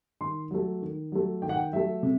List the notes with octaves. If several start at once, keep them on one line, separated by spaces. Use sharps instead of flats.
D#3 C6
F#3 A3
D#3
F#3 A3
D#3 G5
F#5
G5
F#3 A3 E5
C3